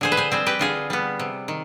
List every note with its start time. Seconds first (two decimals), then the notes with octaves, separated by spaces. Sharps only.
0.01 D3 G#4 C5
0.12 B4
0.17 G#4 C5
0.31 G3 C4 G#4 C5
0.46 G4 B4
0.59 D3 F4 G#4
0.90 G3 B3
1.19 C3
1.48 D#3